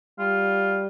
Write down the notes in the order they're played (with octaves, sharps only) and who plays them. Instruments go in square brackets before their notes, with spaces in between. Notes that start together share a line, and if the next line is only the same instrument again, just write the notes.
[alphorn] G3 [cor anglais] F4